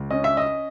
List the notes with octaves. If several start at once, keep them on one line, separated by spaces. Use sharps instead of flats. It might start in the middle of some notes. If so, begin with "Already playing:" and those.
Already playing: C#2
C#4 D#5
E5
D#5